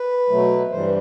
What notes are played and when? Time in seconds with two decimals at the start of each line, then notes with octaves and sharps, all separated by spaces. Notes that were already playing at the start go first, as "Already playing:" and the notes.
Already playing: B4
0.29 B2 F#3 A3
0.71 G2 E3 G3 C5